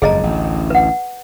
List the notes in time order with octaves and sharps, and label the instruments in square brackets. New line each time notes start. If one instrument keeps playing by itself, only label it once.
[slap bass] F#1 F2 G#2 [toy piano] G#4 D#5 A#5
[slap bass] A1 D2
[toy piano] B4 F#5